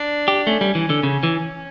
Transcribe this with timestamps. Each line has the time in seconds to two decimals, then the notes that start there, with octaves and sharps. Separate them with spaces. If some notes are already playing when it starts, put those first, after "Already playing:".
Already playing: D4
0.28 G4
0.47 A3 C#4
0.61 G3
0.75 E3
0.90 D3
1.03 C#3
1.23 E3